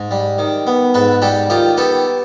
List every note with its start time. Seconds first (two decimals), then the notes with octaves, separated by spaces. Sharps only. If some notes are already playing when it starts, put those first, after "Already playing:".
Already playing: G#2
0.11 G3
0.38 D#3
0.67 B3
0.94 G#2 A4 B4
1.22 G3 G4 A4
1.50 D#3 F4 G4
1.77 B3 G4 A4